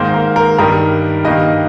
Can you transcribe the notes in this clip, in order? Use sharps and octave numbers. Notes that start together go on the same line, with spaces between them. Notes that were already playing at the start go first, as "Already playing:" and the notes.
Already playing: G#2 D#3 A#3 C5
A#4
A#4
G2 D#3 G3 A#4
G2 D#3 A#3 D#5